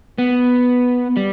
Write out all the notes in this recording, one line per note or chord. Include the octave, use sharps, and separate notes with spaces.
B3
G3